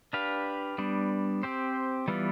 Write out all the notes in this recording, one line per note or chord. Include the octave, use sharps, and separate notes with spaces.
D4 G4 B4 F5
G3 B3 D4
C4 G4 C5
E3 G3 B3 F4